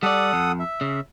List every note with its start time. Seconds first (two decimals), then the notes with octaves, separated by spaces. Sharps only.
0.03 G3 A4 D5 F#5 D#6
0.33 F2
0.59 E5
0.81 C#3